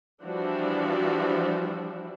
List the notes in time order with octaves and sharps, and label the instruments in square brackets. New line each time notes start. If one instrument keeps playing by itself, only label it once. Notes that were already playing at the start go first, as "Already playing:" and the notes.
[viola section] E3 F3 G3 D4 F#4